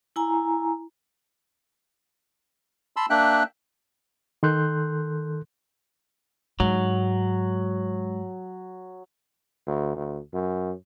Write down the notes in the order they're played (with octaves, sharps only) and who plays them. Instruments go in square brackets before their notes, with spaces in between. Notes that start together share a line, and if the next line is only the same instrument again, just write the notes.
[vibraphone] E4 G#5 A#5
[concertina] A5 B5 C6 E6
A#3 D4 E5 G5 F#6
[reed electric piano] D#3 A4 C6 F#6 G6
[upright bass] G#2 [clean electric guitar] F#3
[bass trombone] D2
D2
F#2